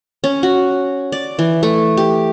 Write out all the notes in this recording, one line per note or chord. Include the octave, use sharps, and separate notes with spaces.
C#4
F#4
D5
E3
A3
G4